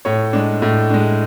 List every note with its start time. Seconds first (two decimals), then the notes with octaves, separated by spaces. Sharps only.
0.05 A2 C#5
0.33 G#3 D4
0.62 A2
0.90 G#3 D4